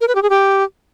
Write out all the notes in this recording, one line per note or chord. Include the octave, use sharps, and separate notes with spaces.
A#4
B4
G4
G#4
G4